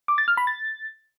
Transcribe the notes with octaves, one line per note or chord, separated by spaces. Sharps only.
D6
A6
F6
B5
A6